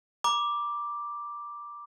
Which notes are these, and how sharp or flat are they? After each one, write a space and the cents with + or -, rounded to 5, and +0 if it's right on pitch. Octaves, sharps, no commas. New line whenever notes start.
A#5 +45 D6 +0